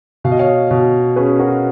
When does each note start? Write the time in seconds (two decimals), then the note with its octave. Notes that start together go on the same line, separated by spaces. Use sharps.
0.24 B2 F5
0.32 D#5
0.39 C#5 F5
0.71 B2
1.16 C#4 G#4 B4
1.39 F#4 A#4